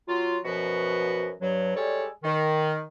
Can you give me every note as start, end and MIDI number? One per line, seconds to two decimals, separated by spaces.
0.08 0.38 54
0.08 0.38 65
0.45 1.31 42
0.45 1.31 47
0.45 1.31 53
0.45 1.31 66
0.45 1.31 71
1.41 1.76 43
1.41 1.76 54
1.76 2.07 55
1.76 2.07 56
1.76 2.07 69
1.76 2.07 73
1.76 2.07 74
2.24 2.82 51